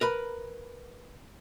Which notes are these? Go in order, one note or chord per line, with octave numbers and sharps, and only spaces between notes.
A#4 B4 B5